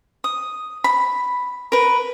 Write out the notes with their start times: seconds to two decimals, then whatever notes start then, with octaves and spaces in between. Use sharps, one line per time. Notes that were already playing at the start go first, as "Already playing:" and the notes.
0.24 D#6
0.84 B5
1.72 A#4 B4